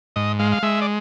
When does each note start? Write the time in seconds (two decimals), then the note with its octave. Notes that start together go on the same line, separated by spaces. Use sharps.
0.16 G#2 D#5
0.39 G#3 F5
0.52 F5
0.63 G#3 E5
0.82 D5